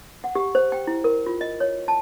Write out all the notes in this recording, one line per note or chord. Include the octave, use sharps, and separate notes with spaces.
F#5
G4
C5
G5
E4
A#4
F4
D#5
C#5
A5